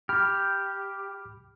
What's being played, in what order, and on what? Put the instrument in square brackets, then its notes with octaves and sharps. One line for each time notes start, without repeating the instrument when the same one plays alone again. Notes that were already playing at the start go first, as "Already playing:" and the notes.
[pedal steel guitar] G4 [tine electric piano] B5 F6